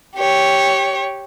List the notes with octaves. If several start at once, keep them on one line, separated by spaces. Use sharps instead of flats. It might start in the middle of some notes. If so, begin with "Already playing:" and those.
G4 C#5